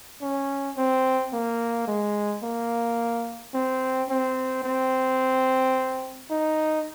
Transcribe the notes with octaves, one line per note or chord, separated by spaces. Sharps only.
C#4
C4
A#3
G#3
A#3
C4
C4
C4
D#4